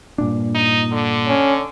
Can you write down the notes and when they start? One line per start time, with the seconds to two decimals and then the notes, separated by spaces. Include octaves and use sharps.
0.18 G2 A#2 D4
0.54 D#4
0.92 D3
1.28 C#4